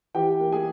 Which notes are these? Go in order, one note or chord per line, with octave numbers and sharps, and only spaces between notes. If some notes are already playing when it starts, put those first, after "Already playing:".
E3 G4 G5
A#3
G#4 G#5